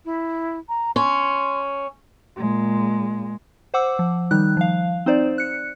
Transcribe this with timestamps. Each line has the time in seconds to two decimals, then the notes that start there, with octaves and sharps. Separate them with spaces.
0.05 E4
0.69 A#5
0.96 C#4 C6
2.37 A#2 G#3
3.74 C5 F#5 D6 E6
3.99 F3
4.31 D#3 G3 D#4 F#6
4.57 F3 F5
5.06 C4 D#4 C5 D5
5.38 F#6 C#7